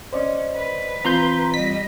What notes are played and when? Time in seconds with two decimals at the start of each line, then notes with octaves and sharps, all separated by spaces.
0.13 C#4 C5 D5 D#5
0.56 B4
1.05 E3 C4 F4 A#5 C6 G6
1.54 G3 D#5 B6